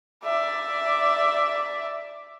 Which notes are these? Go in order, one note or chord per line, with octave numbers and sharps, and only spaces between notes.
D5 E5